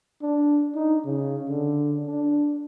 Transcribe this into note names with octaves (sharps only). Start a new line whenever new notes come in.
D4
D#4
C#3
D3
D4